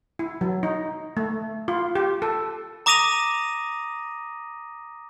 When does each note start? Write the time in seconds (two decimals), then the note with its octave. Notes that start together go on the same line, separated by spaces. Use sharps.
0.19 E4
0.41 F#3
0.63 D#4
1.17 A3
1.68 F4
1.95 G4
2.22 A4
2.86 A#5 D6 D#6 A#6 D#7 F7